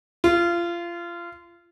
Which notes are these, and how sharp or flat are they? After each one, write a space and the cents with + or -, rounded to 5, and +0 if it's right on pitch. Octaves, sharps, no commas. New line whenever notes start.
F4 -25